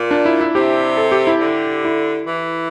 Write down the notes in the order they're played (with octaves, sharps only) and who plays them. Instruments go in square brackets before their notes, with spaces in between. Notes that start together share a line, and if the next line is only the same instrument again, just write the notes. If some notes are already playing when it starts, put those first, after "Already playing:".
Already playing: [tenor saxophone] A#2
[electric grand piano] D4
E4
E4
[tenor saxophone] C3 [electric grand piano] G4
[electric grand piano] A4
G4
E4
[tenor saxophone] D3
[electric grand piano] E4
[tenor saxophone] E3